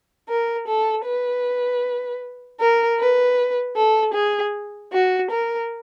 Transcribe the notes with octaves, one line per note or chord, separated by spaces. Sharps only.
A#4
A4
B4
A#4
B4
A4
G#4
F#4
A#4